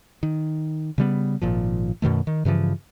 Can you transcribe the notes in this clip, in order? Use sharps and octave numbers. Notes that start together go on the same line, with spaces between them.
D#3
C#3 G3 B3
G#1 A#2 F3
F#2 B2 D#3 A3
D#3
G2 C#3 E3 F3